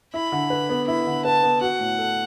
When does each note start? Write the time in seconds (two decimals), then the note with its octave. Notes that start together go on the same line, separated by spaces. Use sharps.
0.14 E4 B5
0.32 D3
0.50 B4
0.69 B3
0.88 E4 B5
1.06 D3
1.24 B4 A5
1.43 B3
1.61 F#4 F#5
1.80 A2
1.98 A4